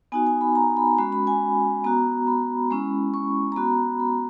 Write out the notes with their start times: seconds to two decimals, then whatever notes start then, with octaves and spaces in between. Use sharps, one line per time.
0.12 B3 D#4 F#4 G#5
0.26 G#5
0.41 B5
0.55 A#5
0.77 B5
0.98 G#3 C#4 F#4 B5
1.12 B5
1.27 G#5
1.84 B3 F#4 A#5
2.27 B5
2.71 G#3 C#4 E4
3.14 C#6
3.52 A#5
3.56 B3 F#4 B5
4.00 B5